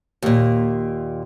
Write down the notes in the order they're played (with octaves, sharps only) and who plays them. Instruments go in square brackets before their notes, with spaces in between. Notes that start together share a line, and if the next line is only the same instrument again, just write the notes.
[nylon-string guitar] D#2 A#2